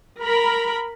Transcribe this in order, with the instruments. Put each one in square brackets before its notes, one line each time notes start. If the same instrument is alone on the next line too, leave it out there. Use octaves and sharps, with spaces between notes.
[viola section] A#4 B5